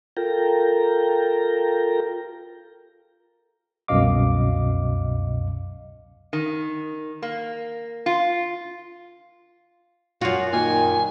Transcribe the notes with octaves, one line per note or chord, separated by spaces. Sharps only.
F4 A4 A#4 G5 A#5
C2 F#2 B2 D#5 F5 D6
D#3
A#3
F4
F#2 F4 F#4
A#2 D#3 G#5